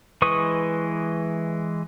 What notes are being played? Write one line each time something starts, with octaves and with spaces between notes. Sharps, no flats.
E3 G#3 B4 C#6 D#6